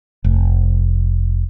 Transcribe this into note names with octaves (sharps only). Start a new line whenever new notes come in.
F1